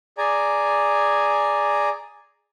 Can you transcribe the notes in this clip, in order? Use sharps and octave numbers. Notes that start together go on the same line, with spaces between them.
G#4 D5 G#5 A#5